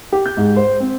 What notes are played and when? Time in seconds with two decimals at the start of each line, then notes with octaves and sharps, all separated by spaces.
0.12 G4
0.26 G6
0.37 G#2
0.56 C5
0.80 C4